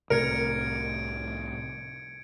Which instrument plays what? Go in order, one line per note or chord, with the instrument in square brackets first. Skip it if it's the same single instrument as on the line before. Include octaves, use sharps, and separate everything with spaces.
[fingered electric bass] C2 A2 C3 [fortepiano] A#4 [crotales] G#6 C#7 D7